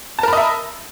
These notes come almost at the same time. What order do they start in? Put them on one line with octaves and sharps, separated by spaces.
A5 A#4 B5 D#5 E5